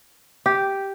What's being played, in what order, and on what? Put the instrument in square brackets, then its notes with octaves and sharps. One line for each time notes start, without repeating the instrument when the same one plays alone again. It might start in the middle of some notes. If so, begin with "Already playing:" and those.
[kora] G4